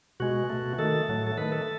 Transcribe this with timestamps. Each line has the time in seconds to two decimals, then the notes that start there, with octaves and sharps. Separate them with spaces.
0.20 B2 G#3 F#4
0.50 B2 A3
0.78 D#3 A3 A4
1.08 A2 F#3 A3
1.27 A4
1.37 D#3 A3 B4
1.52 A4